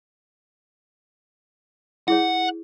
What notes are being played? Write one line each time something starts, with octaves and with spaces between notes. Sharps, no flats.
E4 G#4 C#5 F#5